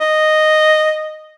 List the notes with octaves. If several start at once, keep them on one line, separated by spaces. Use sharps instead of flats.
D#5